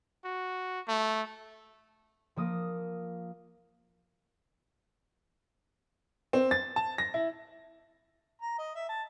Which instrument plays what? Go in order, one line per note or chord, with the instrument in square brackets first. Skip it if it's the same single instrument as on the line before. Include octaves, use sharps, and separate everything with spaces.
[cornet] F#4
A3
[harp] F3 A#3 D#6
[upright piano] C4
A6
A5
A#6
E4
[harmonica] A#5
D#5
E5
A5